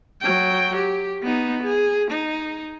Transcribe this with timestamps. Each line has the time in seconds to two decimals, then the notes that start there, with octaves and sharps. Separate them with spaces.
0.21 F#3 G5
0.76 G4
1.23 B3 D#4
1.63 G#4
2.11 D#4